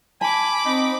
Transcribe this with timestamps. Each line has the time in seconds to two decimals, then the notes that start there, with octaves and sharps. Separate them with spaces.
0.21 G#5 A5 B5 D6
0.66 C4 D#4